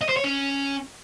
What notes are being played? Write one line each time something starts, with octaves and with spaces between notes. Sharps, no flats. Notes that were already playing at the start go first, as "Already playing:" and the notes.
D#5
C5
C#5
C#4